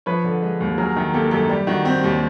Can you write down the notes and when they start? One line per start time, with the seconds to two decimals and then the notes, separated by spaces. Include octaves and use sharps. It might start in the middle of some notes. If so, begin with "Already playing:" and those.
0.06 F3 B4 C#5
0.24 D3
0.42 G#3
0.60 D#2
0.78 F#3 G#4 A#4
0.96 D#3
1.14 A#3 G4 A4
1.31 F#2 G4 A4
1.49 G3 G4
1.67 D#3 F#4
1.85 C4 G4
2.03 D#2 G4